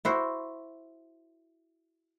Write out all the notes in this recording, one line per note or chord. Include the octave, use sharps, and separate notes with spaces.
E4 F#4 C5